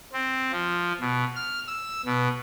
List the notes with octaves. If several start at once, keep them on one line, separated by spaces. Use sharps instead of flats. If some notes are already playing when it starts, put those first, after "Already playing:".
C4
F3
B2
F6
E6
B2